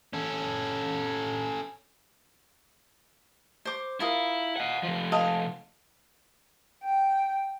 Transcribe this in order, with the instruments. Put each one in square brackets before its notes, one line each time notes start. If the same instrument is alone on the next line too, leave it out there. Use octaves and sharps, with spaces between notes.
[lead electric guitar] C#4 A4
[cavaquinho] C5 D6
[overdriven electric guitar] E4 [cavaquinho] F4 A#4 D#6
[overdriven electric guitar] D#5 F#5
C3 F3
[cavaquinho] D#5 F5 A5
[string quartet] G5